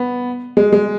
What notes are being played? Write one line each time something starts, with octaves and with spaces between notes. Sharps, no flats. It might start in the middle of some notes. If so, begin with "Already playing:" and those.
Already playing: B3
G#3
G#3